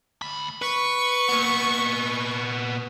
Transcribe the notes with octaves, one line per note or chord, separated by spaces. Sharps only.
D2 B5
B4 C#6
A#2 B3